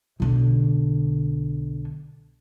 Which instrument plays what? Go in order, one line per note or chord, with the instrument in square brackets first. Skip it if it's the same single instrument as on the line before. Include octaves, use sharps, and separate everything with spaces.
[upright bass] B1 D3